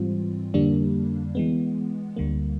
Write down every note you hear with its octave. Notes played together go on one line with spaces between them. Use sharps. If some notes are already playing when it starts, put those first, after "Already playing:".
Already playing: G#2 E3 G3 C4 F4
F2 D3 G3 A#3 D4
E3 G#3 B3
D2 D3 G3 A#3